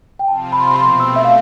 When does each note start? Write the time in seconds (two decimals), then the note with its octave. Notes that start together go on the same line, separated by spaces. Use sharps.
0.19 G5
0.28 C3 F3 C4 F4 A5
0.52 B5
0.60 C6
0.68 B5
0.76 B2 A3 C4 C6
1.00 E6
1.16 E5
1.24 F5